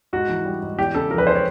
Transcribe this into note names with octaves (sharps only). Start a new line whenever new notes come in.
G#2 F#4
E3
G3
G#2
E2 G4
C#3 A4
F3 A#4
B4
G#3 C5
C#5